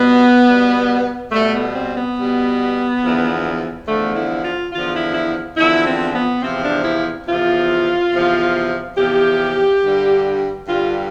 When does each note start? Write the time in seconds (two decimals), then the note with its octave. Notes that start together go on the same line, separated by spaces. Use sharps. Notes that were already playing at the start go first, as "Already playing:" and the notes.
Already playing: B2 G3 B3
0.47 B2 G3
1.32 B2 G3 A3
1.53 B3
1.74 C4
1.96 B3
2.17 B2 G3
3.02 E2 D3 F3
3.87 E2 D3 F3 A3
4.15 E4
4.44 F4
4.72 E2 D3 F3 F4
4.93 E4
5.14 E4
5.57 E2 D3 F3 E4
5.85 C4
6.14 B3
6.42 E2 C3 F3 C4
6.63 D4
6.84 E4
7.27 E2 C3 F3 F4
8.12 E2 C3 F3
8.97 E2 C3 F3 G4
9.82 G2 D3 G3
10.67 G2 D3 G3 F4